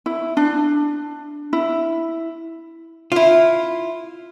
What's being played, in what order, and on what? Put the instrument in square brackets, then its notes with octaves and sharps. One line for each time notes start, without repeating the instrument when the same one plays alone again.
[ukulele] E4
D4
E4
[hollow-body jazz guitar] E4 F4